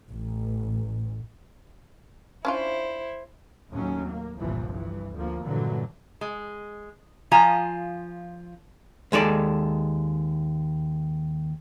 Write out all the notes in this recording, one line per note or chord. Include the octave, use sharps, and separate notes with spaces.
A1
C#4 D4 E4 F4 C5
D#2 A2 F#3 C#4
A#3
G1 C2 A#2 E3 F3
G2 E3
D2 F3 A#3
G2 A#2 D3 E3 F#3
G#3
F3 F4 G#5 A#5
D#2 G#3 A4 D5